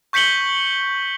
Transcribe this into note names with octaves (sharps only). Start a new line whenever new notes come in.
C#6 G6 B6 C#7 F#7 G7